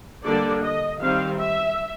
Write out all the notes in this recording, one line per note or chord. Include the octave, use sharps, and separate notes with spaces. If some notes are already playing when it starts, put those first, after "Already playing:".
D3 G3 A#3 D4 D5
D#5
D#3 G3 C4 F5
E5